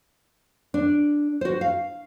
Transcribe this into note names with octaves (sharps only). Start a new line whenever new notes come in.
D4
F#4 C5
F5